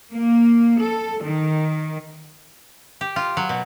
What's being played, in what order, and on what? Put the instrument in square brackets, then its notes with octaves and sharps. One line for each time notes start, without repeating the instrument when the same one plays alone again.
[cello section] A#3
A4
D#3
[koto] G4
F4
F#3
B2